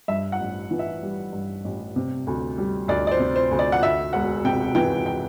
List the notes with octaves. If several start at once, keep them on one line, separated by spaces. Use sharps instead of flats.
G2 E5
F#5
A1
E3
E5
G3
G2
A1
C3
D2
G3
D2 D5
D5
C5
C3
C5
D2
D5
F#5
D2 E5
E1 F#5
C3 G5
E3 G5
G5